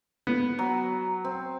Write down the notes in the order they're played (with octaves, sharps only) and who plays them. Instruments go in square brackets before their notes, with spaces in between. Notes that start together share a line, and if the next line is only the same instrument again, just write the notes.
[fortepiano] B3
[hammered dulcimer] F#3
C4